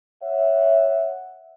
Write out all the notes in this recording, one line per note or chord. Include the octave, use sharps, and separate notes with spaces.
C#5 E5 F#5